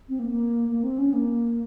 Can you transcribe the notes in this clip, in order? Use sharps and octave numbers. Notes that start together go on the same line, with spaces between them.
C4
A#3
A#3
A#3
C4
C#4
A#3